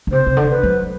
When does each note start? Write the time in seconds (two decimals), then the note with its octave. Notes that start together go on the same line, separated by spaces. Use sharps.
0.07 D3
0.12 C3 C5
0.26 C3
0.37 D3
0.50 B4
0.63 F#3